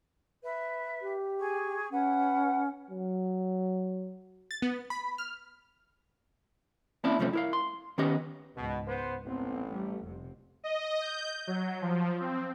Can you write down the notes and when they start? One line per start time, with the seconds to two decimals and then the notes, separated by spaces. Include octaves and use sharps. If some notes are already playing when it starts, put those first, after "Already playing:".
0.43 B4 E5
1.02 G4
1.38 G#4 C#6
1.91 C#4 B4 F#5
2.91 F#3
4.51 A6
4.62 B3
4.90 B5
5.18 F6
7.04 A#3 C4 C#4 E4 D5 A5
7.19 C2 F2 A3 C#4 F4 C5
7.33 E4 A#4 F5
7.53 C6
7.98 D#3 B3 C#4 G4 D#5
8.56 C#2 G#2 B2
8.87 B3 C5
9.25 A1 B3 C4
9.71 G3 A3
10.04 F1 C3
10.64 D#5
11.01 G6
11.47 F#3
11.82 F3
12.20 C4